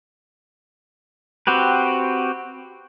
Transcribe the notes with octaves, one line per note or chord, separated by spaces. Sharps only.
C4 F#4 G4 B4